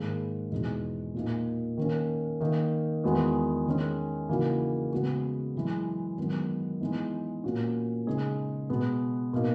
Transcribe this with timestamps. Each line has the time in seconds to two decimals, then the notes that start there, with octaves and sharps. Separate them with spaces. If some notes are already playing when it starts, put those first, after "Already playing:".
Already playing: G#2 D#3 A#3 D#4 G#4
0.52 E2 B2 G#3 D#4 G#4
1.14 A#2 A#3 D#4
1.77 D#3 A#3 C#4
2.40 D#3 A#3 D#4
3.04 E2 D#3 G#3 B3 F#4
3.67 D#3 G#3 C#4
4.29 C#3 E3 A#3 D#4 F#4
4.92 C#3 G#3 B3 F#4
5.55 F#2 E3 G#3
6.18 F#2 D#3 G#3 B3
6.81 E3 G#3 B3 D#4
7.44 A#2 A#3 C#4 F#4
8.07 C#3 G#3 D#4 G#4
8.70 B2 G#3 B3
9.33 B2 A#3 D#4